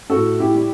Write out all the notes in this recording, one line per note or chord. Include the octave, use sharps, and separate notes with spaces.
A2 F#4 A4
E4 G4
G3